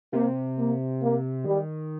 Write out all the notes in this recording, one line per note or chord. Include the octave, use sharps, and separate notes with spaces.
C3 A#3
A#3
A#3
D#3 G3